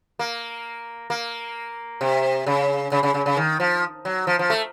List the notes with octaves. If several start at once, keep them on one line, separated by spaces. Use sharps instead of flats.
A#3
A#3
C3
C#3
C#3
C#3
C#3
C#3
D#3
F3
F#3
F3
F3
A3